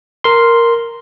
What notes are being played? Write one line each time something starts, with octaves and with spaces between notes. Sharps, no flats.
A#4 C6